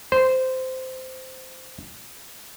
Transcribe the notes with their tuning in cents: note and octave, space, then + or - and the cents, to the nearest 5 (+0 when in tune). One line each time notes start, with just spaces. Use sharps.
C5 -15